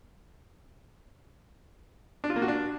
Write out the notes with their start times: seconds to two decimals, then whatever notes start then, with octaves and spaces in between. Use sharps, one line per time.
2.24 D4
2.30 F4
2.36 A#3
2.42 F#4
2.48 D4